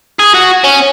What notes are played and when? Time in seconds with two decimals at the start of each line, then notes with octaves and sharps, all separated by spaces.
0.19 G#4
0.34 F#4
0.64 C#4